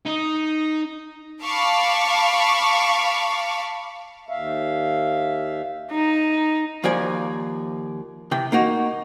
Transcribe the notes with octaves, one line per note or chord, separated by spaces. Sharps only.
D#4
F5 A5 B5 C#6 D6
D#2 E5 F5
D#4
D#2 F3 D5 G#5
C3 E3 G5
A#3 D#4 F#4